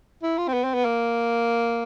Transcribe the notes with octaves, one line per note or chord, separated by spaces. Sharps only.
E4
F4
C4
B3
C4
B3
A#3